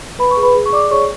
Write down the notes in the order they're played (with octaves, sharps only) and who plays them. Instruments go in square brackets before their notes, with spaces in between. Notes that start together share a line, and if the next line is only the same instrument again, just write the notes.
[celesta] B4 B5
C#6
G#4
B4 B5
G#4
C#6
D5 D6
G#4 C#5 C#6